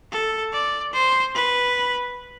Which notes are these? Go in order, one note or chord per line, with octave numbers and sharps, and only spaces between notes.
A4
D5
C5
B4